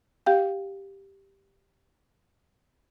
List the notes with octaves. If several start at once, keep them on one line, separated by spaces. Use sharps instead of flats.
G4 F5 G5